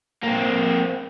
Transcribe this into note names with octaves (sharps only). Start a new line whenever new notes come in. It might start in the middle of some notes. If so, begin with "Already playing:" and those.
A#3 C4